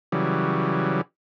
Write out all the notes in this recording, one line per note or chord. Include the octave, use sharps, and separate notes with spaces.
C#3 E3 F#3 G3